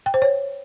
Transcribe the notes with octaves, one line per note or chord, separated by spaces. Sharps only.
G5
C5
C#5